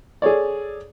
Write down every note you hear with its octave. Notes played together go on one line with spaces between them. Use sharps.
G#4 A4 C#5 D5